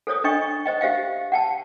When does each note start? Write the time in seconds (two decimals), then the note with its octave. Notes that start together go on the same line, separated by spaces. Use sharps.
0.07 A4 C5 C#5 D#6
0.24 D4 D#5 G5 C#6
0.42 C#6
0.66 C5 D#5 G5
0.81 G4 C5 E5 F5 G5
1.32 F#5 G5 A5